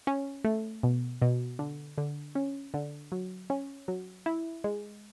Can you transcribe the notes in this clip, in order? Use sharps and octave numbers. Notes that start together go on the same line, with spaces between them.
C#4
A3
B2
B2
D3
D3
C#4
D3
F#3
C#4
F#3
E4
G#3